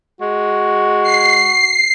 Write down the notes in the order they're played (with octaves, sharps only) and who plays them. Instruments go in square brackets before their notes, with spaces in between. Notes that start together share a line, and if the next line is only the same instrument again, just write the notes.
[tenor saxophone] G#3 [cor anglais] F#4
[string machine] C7